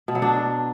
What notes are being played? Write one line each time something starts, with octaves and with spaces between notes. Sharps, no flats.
B2
F#3
D4